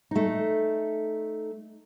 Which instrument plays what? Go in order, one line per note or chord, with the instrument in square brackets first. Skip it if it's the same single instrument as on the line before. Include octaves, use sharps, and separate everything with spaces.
[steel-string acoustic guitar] A3 D#4